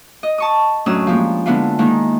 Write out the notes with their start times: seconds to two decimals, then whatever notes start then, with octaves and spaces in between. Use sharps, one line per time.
0.23 D#5
0.38 A5 C#6 D#6
0.86 F#2 A2 C#4 D4 D#6 E6
1.07 F3 G#3 A#3 G4
1.46 D3 G#3 B3 D4 E4 F4
1.79 D#3 G#3 A#3 D#4 E4